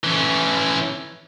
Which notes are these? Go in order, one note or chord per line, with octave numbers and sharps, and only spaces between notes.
E3 C#4